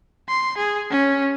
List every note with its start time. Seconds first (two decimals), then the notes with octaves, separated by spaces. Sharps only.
0.28 C6
0.57 G#4
0.90 C#4